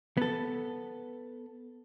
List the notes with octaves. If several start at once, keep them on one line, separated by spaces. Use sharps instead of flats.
B3 A4